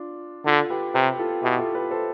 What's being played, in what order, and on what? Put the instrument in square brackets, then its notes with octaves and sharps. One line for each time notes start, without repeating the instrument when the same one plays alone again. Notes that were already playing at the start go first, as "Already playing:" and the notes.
Already playing: [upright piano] D4 F4
[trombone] D3 [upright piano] F4 A4
[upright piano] G4 B4
[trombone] C3 [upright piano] G4 B4
[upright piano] F4 A4
[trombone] B2 [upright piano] E4 G4
[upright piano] F4 A4
G4 B4
A4 C5